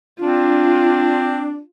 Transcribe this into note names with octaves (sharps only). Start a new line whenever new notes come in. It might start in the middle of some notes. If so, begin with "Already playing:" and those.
C4 D4 F4